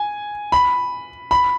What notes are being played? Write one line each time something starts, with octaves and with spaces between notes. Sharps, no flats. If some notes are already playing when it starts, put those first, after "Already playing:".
Already playing: G#5
B5
B5